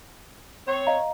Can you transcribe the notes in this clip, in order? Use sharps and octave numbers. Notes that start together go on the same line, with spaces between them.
C4 C#5
D#5 F5 A#5